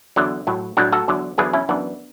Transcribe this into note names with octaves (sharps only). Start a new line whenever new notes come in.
E2 D3 F#3
A2 F#3
A2 F#3 D4 F#4
F#4 A4
E2 D3 F#3
E2 D3 F#3 G#4 B4
C#4 E4
F#2 E3 B3 D4